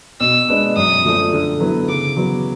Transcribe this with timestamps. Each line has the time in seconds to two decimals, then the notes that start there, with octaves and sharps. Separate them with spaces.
0.21 B2 E6
0.48 G#3 B3 D4
0.76 F#2 D#6
1.05 D3 F3 A3 D4
1.33 D3
1.60 F#3 B3 E4
1.88 C#3 D6
2.17 F#3 B3